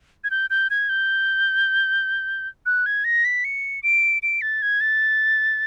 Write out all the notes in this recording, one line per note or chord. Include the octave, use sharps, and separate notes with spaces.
G#6
G6
G6
G#6
G6
F#6
G#6
A#6
B6
C#7
D7
D7
A6
G#6
A6